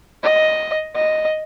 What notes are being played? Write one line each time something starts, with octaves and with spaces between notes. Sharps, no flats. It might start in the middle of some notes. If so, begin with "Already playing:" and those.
D#5
D#5